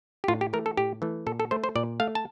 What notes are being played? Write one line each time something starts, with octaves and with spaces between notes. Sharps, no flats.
G4
A2 F4
G4
E3 A3 A#4
A4
A2 G4
E3 A3
A#2 A4
A4
A3 C5
C5
A#2 D5
A3 F5
A5